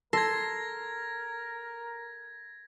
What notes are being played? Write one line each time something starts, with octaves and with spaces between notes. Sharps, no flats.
A4 A#4 C6 G#6 A#6